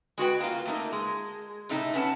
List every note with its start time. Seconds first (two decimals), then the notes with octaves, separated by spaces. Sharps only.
0.18 G#3 F#4 B4 G5
0.40 A#3 F4
0.65 A3 A#3 D#4
0.92 G#3
1.69 A2 C3 A3 D#4
1.94 B3 C#4 A5